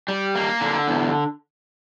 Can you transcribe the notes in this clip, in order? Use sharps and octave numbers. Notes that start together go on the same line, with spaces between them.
G3
A#3
D3
E2